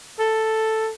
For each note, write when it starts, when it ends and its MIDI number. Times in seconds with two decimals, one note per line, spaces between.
0.19 0.89 69